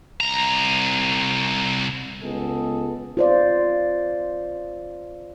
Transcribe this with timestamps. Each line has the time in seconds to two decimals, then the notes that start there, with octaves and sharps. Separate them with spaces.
0.20 C2 A#5
2.21 C#2 B3 G#4 A4 D#5
3.17 F4 C5 D5